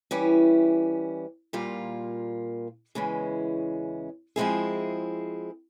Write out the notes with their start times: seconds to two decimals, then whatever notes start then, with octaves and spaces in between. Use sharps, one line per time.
0.11 E3 G3 C#4
1.53 A#2 G3 A#3 F4
2.95 E2 C#3 E3 G#3 C#4
4.36 F3 G#3 C4 E4 G#4